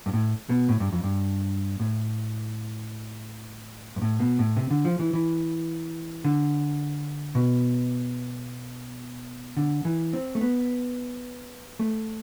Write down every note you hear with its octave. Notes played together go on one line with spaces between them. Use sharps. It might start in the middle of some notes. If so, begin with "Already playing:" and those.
G2
A2
B2
A2
G2
F2
G2
A2
G2
A2
B2
A2
C3
D3
F3
E3
E3
D3
B2
D3
E3
C4
A3
B3
A3